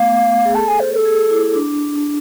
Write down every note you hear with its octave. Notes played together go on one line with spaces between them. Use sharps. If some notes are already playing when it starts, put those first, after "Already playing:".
Already playing: A3 B3 F5
G#4
A4 A5
G#5
C5
C5
A4
G#4
E4
D4
D4